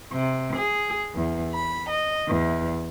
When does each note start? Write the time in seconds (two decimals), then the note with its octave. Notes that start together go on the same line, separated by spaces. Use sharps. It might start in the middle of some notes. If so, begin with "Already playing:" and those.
0.10 C3
0.56 G#4
1.15 E2
1.53 B5
1.89 D#5
2.28 E2